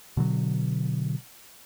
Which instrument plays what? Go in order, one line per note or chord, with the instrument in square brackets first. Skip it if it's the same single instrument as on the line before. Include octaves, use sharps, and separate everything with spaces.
[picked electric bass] B2 D3 F#3